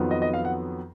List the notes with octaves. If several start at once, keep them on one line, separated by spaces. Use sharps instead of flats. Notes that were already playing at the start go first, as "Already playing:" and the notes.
Already playing: F2 D#3 F#3 B3 F4
D#5
D#5
F5
F#5